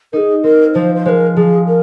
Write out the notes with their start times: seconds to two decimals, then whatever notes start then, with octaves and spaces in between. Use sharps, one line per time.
0.13 D#4 G#4 A#4
0.43 C4 A#4
0.74 F3 C5
0.95 C5
1.05 G#3 A#4 C5
1.36 F3 G#4
1.67 A#4